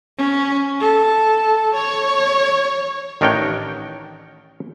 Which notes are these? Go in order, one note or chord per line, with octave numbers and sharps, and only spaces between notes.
C#4
A4
C#5
A1 D#3 D4 A#4 C#5 G5